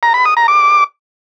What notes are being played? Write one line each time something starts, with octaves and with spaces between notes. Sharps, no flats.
A#5
B5
D#6
A#5
D6